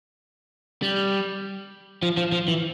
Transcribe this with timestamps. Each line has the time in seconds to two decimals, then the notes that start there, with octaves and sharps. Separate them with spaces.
0.82 G3
2.03 F3
2.17 F3
2.32 F3
2.48 E3